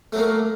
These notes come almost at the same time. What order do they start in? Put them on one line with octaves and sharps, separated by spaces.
A3 F#3 A#3